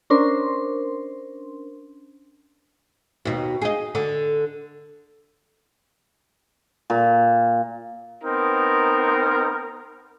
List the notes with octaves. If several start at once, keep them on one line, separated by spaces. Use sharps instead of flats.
C#4 D4 A#4 C5 C6
D#2 B2
G#4 D#5
D3
A#2
B3 C4 D#4 A#4